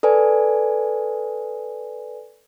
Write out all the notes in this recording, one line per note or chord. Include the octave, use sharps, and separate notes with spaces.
A4 B4 D5 G#5